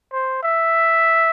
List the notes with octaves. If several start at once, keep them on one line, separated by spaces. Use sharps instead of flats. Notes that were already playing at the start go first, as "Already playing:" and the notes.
C5
E5